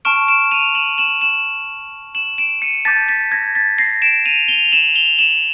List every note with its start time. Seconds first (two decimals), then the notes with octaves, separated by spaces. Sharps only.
0.05 A5 C#6 F6 D7 E7
0.28 D7 E7
0.51 D#7 F7
0.75 E7 F#7
0.98 E7 F#7
1.21 E7 F#7
2.15 E7 F#7
2.38 D7 E7
2.62 C#7 D#7
2.85 A5 D6 G6 A6 B6
3.08 A6 B6
3.32 G#6 A#6
3.55 A6 B6
3.79 A#6 C7
4.02 D7 E7
4.25 D#7 F7
4.48 F7 G7
4.65 F7
4.72 E7 F#7
4.95 F7 G7
5.19 E7 F#7